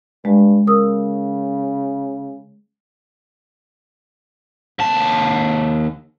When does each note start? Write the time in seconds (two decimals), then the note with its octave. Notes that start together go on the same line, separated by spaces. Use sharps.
0.25 G2 G#3
0.67 C#3 A#4 D#6 E6
4.79 D#2 A5